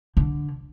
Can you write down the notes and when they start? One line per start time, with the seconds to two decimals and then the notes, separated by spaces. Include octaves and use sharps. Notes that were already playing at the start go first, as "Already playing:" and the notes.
0.17 D3